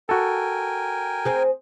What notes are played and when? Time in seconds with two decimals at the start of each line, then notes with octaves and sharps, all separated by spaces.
0.09 F#4 A4 A#4 G5 G#5
1.25 C4 G#4